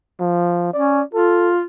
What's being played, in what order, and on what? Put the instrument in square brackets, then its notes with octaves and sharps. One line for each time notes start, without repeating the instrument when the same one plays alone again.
[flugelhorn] F3
[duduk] C#4 [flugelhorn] D5
[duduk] F4 [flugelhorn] A4